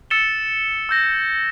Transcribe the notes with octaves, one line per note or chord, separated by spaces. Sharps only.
E6 A6 C#7 E7 G7
E6 G6 A#6